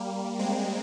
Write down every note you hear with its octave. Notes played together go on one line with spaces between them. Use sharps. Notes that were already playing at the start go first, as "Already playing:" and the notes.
Already playing: G3 A#3
G#3 C4